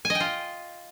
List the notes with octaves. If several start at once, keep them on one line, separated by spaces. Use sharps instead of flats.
G#5
D#5
G5
F4